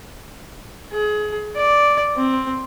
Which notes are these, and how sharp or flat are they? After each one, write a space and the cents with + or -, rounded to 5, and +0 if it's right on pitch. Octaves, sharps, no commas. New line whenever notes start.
G#4 +25
D5 -5
C4 +5